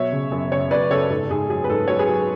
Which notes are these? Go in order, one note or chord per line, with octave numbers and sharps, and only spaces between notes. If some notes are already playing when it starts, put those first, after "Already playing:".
Already playing: B2 F#3 C#5 E5
C#3
F#2
C#3 C#5 E5
F#2 B4 D5
C#3 A4 C#5
G#2 A4
G#2 G#4
F#3 G#4
B4
G#2 A4
F#3 C#5
G#4 B4
F#3